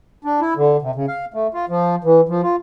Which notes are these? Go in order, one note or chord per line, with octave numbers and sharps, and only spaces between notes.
D4
E4
D3
C3
C#3
F5
A3
F4
F3
E3
F3
F4